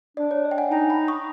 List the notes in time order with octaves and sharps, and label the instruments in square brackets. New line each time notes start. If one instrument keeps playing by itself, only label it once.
[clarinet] D4 [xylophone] D5
[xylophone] C#5
D#5
G5
F#5 G#5
[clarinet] D#4 [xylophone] G5 A5
[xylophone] A5 B5
C#6 D#6